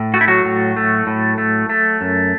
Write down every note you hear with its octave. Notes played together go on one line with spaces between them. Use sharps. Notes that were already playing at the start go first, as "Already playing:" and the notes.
Already playing: A2
A3 F#4
E4
F#3 F#4
A2
A3
A2
A3
A3
F#2